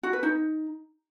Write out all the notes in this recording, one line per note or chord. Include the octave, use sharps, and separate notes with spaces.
F#4
B4
D#4